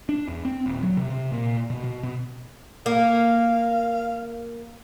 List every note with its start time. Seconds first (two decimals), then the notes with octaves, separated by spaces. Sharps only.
0.09 D4
0.28 E2
0.45 C4
0.66 D#1
0.83 F#3
0.97 C3
1.10 C3
1.32 A#2
1.70 B2
1.84 B2
2.04 B2
2.86 A#3 F5